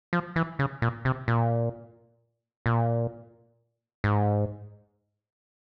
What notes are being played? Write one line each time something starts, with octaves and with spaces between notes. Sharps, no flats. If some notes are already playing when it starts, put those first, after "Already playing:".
F3
E3
C#3
A#2
C3
A#2
A#2
G#2